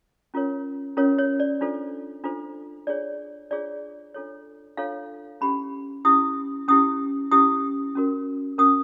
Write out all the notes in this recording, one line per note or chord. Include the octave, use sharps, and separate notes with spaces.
C#4 F4 A#4 C#5
C#4 F4 A#4 C#5
C#5
D5
D4 F4 A4 C5
D4 F4 A4 C5
D4 F4 G#4 C#5 D5
D4 F4 G#4 C#5 D5
D4 F4 A4 C#5
D4 F4 A4 C#5 F5
C#4 E4 G4 B5
C#4 E4 G4 D#6
C#4 E4 G4 D#6
C#4 E4 G4 D#6
C#4 F#4 A#4
C#4 F#4 A#4 D#6